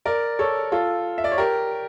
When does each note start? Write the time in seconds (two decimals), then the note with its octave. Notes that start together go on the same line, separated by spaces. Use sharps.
0.05 A#4 D5
0.39 A4 C#5
0.72 F4 A4
1.18 E5
1.24 D5
1.32 C#5
1.38 G4 A#4